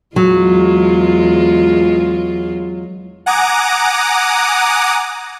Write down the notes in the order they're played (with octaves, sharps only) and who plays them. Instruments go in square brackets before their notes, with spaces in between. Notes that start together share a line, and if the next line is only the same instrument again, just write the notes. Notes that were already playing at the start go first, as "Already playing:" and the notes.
[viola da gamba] E2 G#3 F4 [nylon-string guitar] F#3
[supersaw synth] F#5 G#5 A#5 D6 D#6